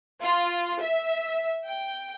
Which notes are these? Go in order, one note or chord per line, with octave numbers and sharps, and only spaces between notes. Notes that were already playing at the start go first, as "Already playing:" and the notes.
F4
E5
G5